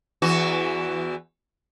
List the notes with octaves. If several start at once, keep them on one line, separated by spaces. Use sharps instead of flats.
E2 E3 F#4